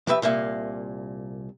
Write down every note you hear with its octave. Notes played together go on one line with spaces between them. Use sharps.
F3 G4 B4 E5
C2 A#2 A#3 E5